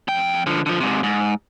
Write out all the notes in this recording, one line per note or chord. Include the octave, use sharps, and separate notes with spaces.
F2 G5
D3 F3
D3 F3
G#2 C3
G#2